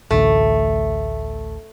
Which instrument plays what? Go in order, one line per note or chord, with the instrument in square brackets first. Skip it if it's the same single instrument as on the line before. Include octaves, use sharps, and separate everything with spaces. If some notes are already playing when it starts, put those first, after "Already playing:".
[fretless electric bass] A1 D2 [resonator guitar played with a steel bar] A3